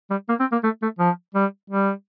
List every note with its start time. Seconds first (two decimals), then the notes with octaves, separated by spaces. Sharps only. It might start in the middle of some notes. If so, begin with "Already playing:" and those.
0.10 G3
0.29 A#3
0.40 C4
0.52 A#3
0.63 A3
0.82 A3
0.99 F3
1.34 G3
1.70 G3